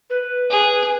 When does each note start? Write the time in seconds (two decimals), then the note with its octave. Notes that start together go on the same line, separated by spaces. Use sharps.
0.10 B4
0.50 G#4